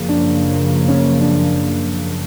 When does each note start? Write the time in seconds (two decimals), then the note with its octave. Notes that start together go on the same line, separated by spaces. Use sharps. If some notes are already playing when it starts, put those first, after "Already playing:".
Already playing: F#2 C#3 F3 A#3
0.09 D4
0.88 C#4
1.21 D4